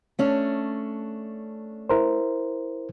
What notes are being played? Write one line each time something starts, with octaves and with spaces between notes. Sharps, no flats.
A3 C#4 D4
E4 A#4 C5